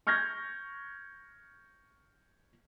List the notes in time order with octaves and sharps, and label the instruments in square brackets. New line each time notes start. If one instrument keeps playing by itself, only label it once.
[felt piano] C#6 F6 G6 G#6 A#6